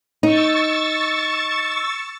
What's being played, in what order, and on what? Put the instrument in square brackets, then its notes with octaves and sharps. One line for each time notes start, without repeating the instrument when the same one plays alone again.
[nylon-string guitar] D#4 [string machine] C#6 E6 A6